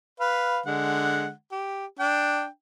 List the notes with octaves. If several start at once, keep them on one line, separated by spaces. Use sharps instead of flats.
B4 F5
D3 G#3 F#5
G4
D4 G5